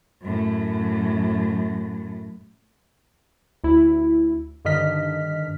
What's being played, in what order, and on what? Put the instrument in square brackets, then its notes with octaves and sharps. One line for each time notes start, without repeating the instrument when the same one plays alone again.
[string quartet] F#2 A2
[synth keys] D2 E4
G2 D3 D#3 D#5 F6 B6